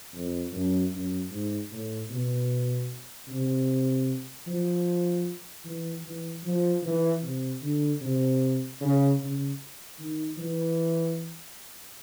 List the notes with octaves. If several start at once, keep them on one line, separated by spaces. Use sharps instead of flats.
F2
F#2
F#2
G#2
A2
B2
C3
F3
E3
E3
F3
E3
C3
D3
C3
C#3
C#3
D#3
E3